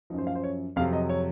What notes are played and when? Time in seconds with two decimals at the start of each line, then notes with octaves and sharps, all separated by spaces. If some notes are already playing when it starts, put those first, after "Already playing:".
0.10 F3 D#4
0.13 F#2
0.18 C5
0.27 F5
0.35 C5
0.44 C#5
0.76 F2 C3 F#3 F5
0.93 D#5
1.09 C#5